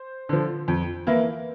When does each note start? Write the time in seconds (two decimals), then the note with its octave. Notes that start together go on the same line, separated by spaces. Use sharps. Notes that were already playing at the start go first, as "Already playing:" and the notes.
Already playing: C5
0.29 D3 F3
0.68 F2
1.07 E3 A#3 E4